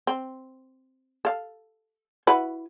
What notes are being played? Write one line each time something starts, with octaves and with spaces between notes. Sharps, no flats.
C4
A4 F5
E4 F#4 B4